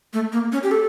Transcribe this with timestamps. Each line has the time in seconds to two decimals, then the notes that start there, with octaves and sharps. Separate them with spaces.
0.13 A3
0.32 A#3
0.52 C#4
0.63 G4
0.71 A4